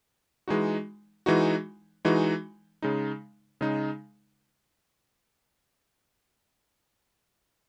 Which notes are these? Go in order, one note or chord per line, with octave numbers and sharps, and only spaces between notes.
E3 G#3 D#4 F#4
E3 G#3 D#4 F#4
E3 G#3 D#4 F#4
C#3 G#3 D#4
C#3 G#3 D#4